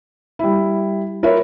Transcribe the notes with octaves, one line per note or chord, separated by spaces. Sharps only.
G3 E4
F4 A#4 B4 C#5 E5